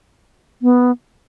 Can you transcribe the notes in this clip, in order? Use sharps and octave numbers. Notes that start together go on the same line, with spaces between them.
B3